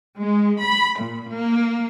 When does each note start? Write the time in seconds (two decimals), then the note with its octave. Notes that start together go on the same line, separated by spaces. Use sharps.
0.20 G#3
0.62 B5
0.99 A#2
1.32 A#3